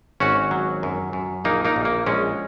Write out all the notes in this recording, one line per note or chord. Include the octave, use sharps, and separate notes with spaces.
G#1 C#4 F#4
F#3
F#2
F#2
A#1 A#3 D#4
A#3 D#4
A#1
A#3
A#1 G#3 C#4